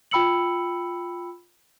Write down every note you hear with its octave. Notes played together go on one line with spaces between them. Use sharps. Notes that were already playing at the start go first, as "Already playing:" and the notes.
F4 G5 B5 E6 C#7 F#7